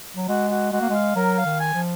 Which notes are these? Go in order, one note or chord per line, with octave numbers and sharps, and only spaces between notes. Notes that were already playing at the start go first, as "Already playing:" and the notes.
F#3
G#3 F#4
F#4
G#3 F#4
A#3
G#3 F5
F#3 A#4
F5
D#3
G#5
F3